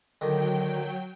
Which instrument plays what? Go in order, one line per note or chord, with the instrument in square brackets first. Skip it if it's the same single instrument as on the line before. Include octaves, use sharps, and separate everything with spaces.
[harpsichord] D3 D#3 [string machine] F#3 G5